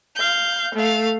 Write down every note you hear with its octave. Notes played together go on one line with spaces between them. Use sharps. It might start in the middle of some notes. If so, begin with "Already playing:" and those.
F5 G6
A3 F5